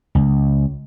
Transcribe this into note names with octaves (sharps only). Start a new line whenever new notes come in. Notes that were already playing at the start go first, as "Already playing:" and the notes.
C#2